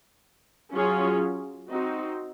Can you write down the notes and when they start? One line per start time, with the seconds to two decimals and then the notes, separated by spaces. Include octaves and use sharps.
0.74 F#3 C#4 F4 G#4 C#5
1.70 C4 D#4 F#4